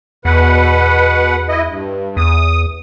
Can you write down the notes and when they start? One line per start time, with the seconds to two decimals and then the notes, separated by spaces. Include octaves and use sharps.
0.25 E2 B2 B4 F#5
1.48 E4 D#5
1.67 G2
2.17 E2 D#6